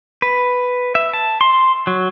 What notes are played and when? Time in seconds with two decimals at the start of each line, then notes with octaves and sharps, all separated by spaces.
0.22 B4
0.95 E5
1.13 A5
1.41 C6
1.87 F#3